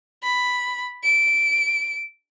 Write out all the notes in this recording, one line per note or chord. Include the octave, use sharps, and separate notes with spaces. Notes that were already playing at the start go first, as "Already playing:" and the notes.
B5
D7